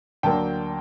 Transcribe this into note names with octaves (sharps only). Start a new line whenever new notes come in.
D2 D3 F#3 A#3 D4 G5 A5